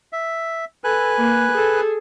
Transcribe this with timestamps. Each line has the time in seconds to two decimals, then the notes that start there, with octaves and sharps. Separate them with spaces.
0.13 E5
0.84 A4 B4 G#5 F#6
1.18 A#3
1.52 G#4 A4